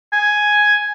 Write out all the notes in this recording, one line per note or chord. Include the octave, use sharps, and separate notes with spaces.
G#5